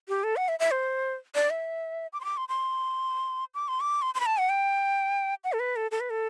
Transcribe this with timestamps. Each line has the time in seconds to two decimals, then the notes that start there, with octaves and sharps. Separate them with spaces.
0.08 G4
0.24 A4
0.36 F#5
0.48 E5
0.60 E5
0.71 C5
1.35 D5
1.50 E5
2.13 D6
2.21 C6
2.24 D6
2.37 C6
2.49 C6
3.54 D6
3.68 C6
3.80 D6
4.02 C6
4.15 C6
4.20 B5
4.26 A5
4.38 F#5
4.49 G5
5.44 F#5
5.53 A4
5.60 B4
5.76 A4
5.91 A4
6.00 B4
6.10 A4